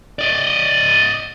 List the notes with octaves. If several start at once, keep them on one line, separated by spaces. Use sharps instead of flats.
D5 D#5